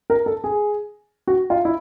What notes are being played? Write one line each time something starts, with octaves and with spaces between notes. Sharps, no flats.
A#4
A4
G#4
F#4
F4
E4